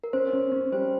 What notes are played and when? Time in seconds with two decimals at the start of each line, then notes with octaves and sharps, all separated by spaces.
0.04 A#4
0.13 C#4 C5
0.33 C#4
0.52 C#4
0.72 G3 C5